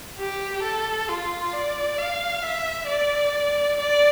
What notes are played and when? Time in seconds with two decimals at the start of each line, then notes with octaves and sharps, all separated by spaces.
0.19 G4
0.63 A4
1.09 F4
1.53 D5
1.98 F5
2.43 E5
2.87 D5
3.77 D5